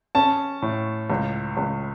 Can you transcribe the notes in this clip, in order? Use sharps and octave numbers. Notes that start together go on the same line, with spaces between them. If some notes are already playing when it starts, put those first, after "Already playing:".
C#4 A5
A2
C#2
C#2